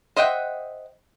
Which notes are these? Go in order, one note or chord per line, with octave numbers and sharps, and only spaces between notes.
C5 D#5 E5 F#5 G5